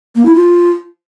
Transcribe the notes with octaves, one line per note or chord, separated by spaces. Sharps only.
A#3
E4
F4